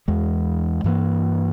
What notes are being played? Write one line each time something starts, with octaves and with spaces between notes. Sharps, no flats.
E2 E3 G#3
G2 E3 A#3